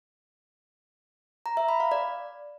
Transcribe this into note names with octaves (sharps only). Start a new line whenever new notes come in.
A#5
E5
B5
F5
D5